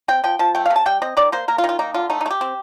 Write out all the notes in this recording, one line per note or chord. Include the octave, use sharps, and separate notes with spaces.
C4 G5
F3 G5
F3 A5
A3 G5
F5
C3
A5
G3 G5
C4 D#5
D#3 D5
A#3 C5
A#3 A#4
F4
D#3
F4
A#3 D#4
D3 F4
A3 D#4
D#4
A3
G4
C4